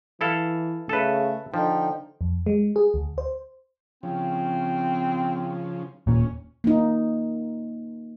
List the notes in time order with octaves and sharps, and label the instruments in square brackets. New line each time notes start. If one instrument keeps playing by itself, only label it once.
[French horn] E3 [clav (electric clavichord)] E4 A4 F5
[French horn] C#3 [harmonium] A3 [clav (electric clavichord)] A4 B4
[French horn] D3 [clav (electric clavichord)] F3 [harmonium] D#4 G5
[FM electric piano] F2
G#3
G#4
D2
C5
[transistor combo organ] C#3 F3 [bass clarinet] C4
[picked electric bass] D#1 A#2 [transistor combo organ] C#4
[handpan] A#3 D#4